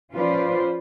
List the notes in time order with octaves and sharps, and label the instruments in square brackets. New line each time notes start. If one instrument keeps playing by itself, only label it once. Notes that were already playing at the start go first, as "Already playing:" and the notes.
[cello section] F3 C#4 F4 B4 C5 D5